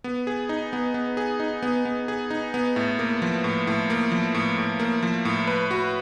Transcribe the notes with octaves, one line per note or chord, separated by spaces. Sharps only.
B3
G#4
D#4
B3
B3
G#4
D#4
B3
B3
G#4
D#4
B3
A2
A#3
F3
A2
A2
A#3
F3
A2
A2
A#3
F3
A2
B4
F#4